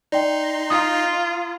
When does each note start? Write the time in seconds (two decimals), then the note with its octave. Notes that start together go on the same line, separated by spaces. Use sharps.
0.12 D#4 D5 G5 C6
0.70 F4 A#5 D#6